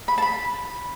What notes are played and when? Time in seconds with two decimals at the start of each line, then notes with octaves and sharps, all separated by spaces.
0.08 B5
0.18 A5
0.22 B5